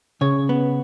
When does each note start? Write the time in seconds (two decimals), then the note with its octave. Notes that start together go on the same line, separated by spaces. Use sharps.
0.21 C#3 C#5
0.49 B3